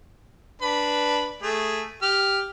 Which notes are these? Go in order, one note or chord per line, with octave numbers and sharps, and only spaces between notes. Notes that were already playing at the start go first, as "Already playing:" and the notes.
D4 B4
A3 G#4
G4 F6